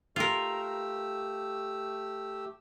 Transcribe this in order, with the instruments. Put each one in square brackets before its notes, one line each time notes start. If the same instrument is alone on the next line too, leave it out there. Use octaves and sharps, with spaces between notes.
[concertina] A3 G4 E6 [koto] F4 A#4